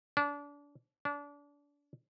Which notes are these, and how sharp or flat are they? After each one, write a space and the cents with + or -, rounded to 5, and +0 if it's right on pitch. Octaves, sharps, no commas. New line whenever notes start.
D4 -30
D4 -30